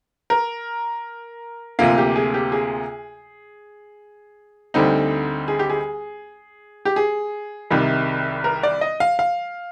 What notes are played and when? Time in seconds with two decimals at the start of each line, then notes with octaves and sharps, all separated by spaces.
0.30 A#4
1.79 D2 C3 F3 A#3 F5
1.98 G4
2.16 G#4
2.34 G4
2.52 G#4
4.74 D2 D3 G3 C4 D#4
5.48 G#4
5.59 G4
5.69 G#4
6.85 G4
6.96 G#4
7.70 C2 C3 D#3 G3
8.44 A#4
8.63 D5
8.81 D#5
9.00 F5
9.19 F5